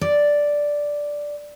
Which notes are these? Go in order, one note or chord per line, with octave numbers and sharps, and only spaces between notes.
D5